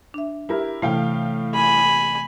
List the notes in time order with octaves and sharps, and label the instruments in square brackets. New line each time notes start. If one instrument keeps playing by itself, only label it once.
[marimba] D4 E5
[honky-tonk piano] E4 G4 A#4
[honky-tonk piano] A2 F5 G5 [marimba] C3 E3 A3
[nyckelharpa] G#5 B5